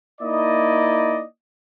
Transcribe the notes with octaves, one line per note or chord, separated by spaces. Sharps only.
A#3 D#4 E4 D5 D#5